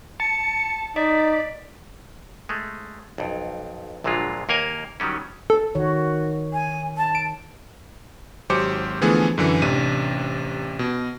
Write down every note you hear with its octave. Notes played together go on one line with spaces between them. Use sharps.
A5 C#7
D#4 D5 D#5 B6
G#3 A3
B1 F2
A#1 A#2 D3 F#3 G#3 F4
D#2 A#3 A#4 G#5
D#3 F#3 G3 C#4
A4
D#3 F#4 C#5
G#5
A5
D7
G#1 F#3 G4 C5 D6 C#7
D3 E3 F3 A3 B3 G#4
F#2 D3 E3
A1 C3 D4 D#7
B2